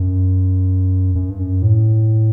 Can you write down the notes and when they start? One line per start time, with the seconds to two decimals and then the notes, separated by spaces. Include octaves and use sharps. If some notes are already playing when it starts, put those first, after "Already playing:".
Already playing: F#2
1.15 F#2
1.30 G2
1.39 F#2
1.62 A2